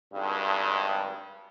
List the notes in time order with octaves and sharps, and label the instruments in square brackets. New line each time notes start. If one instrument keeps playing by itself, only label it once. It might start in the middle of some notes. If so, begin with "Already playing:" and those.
[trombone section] G#1 G2